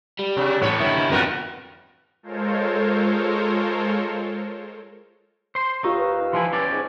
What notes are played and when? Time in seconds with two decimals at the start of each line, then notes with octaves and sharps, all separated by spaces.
0.19 G3
0.37 C3
0.62 A2 E3 B3 C#5
0.81 G2 D#3 E4
1.11 F2 G3 B3 F4 F#4 A#4
2.23 G#3 F4 A4 A#4 C5 C#5
5.55 C5 C6
5.84 D#2 D#4 F4 G4 F5 C#6 E6
5.97 B4
6.33 E3 F3 E4 G#5 A5 C6
6.53 C#4 G4 D5
6.71 G#2